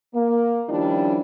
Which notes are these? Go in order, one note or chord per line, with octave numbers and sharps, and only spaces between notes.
A#3
D#3 F3 G3 C#4 D4 E4